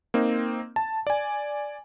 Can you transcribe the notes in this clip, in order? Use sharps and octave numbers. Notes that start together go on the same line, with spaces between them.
A#3 C4 D#4
A5
D5 G#5